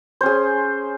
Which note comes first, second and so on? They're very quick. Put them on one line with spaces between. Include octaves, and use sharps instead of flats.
C5 C#4 G#4